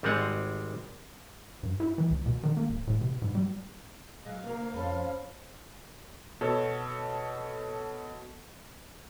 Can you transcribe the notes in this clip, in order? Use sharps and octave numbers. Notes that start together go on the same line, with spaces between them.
G#1 G3 G#3 C4 F#5 G#5
G2
E4
E3
C#2
B2
D#3
A#3
D1
A2
C3
G#2
G3
F#3 G#3 F5
D2 C3 A#3 A#4
F2 C#4 A4 C5 C#5 B5
B2 A4 C#5